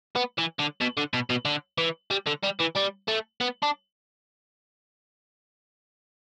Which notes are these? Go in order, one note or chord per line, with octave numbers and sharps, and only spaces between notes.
B3
E3
D3
B2
D3
B2
B2
D3
E3
G3
D3
G3
E3
G3
A3
B3
D4